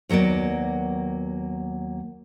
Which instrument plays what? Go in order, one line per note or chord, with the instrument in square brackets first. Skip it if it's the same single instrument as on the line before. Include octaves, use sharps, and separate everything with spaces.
[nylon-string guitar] D#2 F#3 A#3 B3 D5